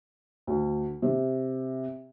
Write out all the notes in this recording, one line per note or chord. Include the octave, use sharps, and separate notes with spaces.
D2
C3